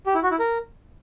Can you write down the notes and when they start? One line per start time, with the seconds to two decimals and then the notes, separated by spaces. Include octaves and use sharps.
0.06 G4
0.15 E4
0.23 F#4
0.31 E4
0.39 A#4